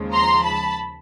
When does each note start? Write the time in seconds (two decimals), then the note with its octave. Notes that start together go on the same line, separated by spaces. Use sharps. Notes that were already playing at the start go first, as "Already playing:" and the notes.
Already playing: D#2 C#3 F3 G#3
0.14 A#5 C6
0.45 A5 B5